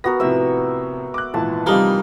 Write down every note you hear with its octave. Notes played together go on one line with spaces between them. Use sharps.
B3 F#4 A#4 A#6
A2 C3 F3 E5 E6
D6 F#6
G#1 A#2 E3 A5
C3 E3 F3 G3 A#3 D#4 A#4